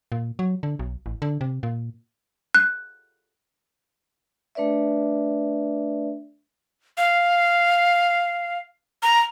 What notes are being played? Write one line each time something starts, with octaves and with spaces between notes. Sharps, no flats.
A#2
F#3
D3
B1
A1
D3
C3
A#2
F#6
A3 D4 B4 D5 E5
F5
A#5